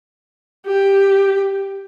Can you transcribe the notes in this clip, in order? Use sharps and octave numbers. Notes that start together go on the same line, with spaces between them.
G4